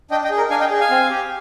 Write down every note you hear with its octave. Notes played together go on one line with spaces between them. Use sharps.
D4 D#5 G5
D#5 G5
G#4
A#4
D4 F5 G#5
D#5 G5
G#4
F5 G#5
C4
G4